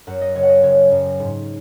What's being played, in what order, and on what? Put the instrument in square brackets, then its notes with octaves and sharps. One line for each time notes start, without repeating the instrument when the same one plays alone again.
[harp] F#2 F#5
D#5
F#1 C#5
F#5
D#5
F#1 C#5
F#2
G#2